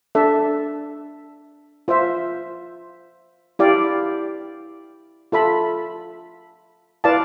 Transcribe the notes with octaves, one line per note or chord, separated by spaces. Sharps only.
D4 A4 E5
F4 C5 E5
E4 G4 D5 F5
F4 A4 E5 B5
E4 B4 D5 F5 A5